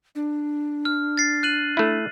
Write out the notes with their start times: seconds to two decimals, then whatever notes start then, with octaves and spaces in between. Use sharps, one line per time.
0.15 D4
0.85 F6
1.17 A6 C7
1.43 F#6 D#7 F#7
1.77 A3 E4